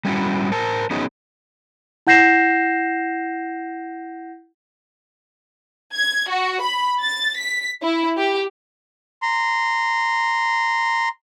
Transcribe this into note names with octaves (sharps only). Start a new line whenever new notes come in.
G3 A3 C#4 D#4 E4 F#4
A#4 C5 A5
F#3 B3 C#4 D#4 G#4 D#5
E4 F#5 G6 A#6 C7 E7
G#6
F#4
B5
A6
B6
E4
G4
A#5 C6